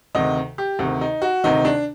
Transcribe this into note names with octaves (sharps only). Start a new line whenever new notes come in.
D2 C3 D#3 D#5
G4
D2 C3 D#3
D#4
F#4
D2 C3 D#3 D#4
D4